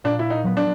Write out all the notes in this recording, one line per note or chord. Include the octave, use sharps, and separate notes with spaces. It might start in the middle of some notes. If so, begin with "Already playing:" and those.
A#2 D4
E4
D#4
F#3 B3
D4